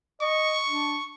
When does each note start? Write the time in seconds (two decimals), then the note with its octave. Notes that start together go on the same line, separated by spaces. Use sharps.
0.21 D#5 C#6
0.70 D4